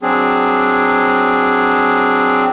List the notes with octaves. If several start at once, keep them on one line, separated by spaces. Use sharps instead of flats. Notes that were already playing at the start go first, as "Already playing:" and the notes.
F#3 C4 D4 G#4